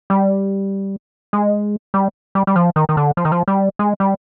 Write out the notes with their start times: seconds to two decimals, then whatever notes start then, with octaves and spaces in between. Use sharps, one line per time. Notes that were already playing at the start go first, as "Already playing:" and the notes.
0.10 G3
1.33 G#3
1.94 G3
2.35 G3
2.47 G3
2.56 F3
2.76 D#3
2.89 D#3
2.97 D3
3.17 F3
3.25 D#3
3.32 F3
3.48 G3
3.79 G#3
4.00 G3